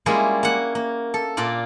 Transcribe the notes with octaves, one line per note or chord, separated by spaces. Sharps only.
G3 G#3 A#3 C#4 E4 F4
A#3 F#5
A#3
A4
A#2 A#3 F4 D5